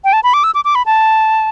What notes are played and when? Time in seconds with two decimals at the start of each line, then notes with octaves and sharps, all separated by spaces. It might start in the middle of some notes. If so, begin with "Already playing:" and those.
0.04 G5
0.13 A5
0.24 B5
0.34 D6
0.44 E6
0.55 D6
0.65 D6
0.75 B5
0.86 A5